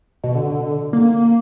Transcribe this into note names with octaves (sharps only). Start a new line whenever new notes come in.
B2
D3
A#3